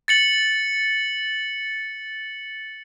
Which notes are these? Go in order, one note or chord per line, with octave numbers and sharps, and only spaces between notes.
A6 C#7 F#7